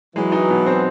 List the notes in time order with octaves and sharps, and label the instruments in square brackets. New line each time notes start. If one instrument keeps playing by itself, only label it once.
[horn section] E3 F#3 [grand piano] G#3
[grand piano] D#4
B2
C4